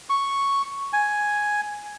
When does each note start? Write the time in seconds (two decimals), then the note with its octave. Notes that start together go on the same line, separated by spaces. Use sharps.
0.10 C#6
0.93 G#5